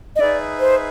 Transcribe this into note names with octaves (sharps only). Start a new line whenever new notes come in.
D#5
D#4 G#4 B4 D5 E5
C5